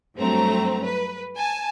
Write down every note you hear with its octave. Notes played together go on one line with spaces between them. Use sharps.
G2 F#3 A3 C4 A#5
B4
G#5 A5